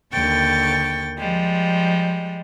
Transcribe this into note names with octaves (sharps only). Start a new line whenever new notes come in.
D#2 D3 G5 C#6 A6
F3 G3 G#3